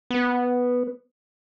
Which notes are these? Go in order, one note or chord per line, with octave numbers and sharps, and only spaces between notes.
B3